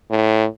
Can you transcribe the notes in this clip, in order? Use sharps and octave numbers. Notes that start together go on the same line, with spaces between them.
A2